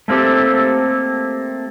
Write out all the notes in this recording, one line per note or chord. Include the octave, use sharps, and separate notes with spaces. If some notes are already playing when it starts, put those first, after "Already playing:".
A3 A#3 C4 G4 A4